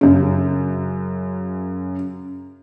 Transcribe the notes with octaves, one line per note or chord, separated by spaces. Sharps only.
F#2 C#3